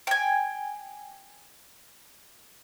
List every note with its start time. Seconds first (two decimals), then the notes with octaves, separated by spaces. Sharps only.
0.07 G5 G#5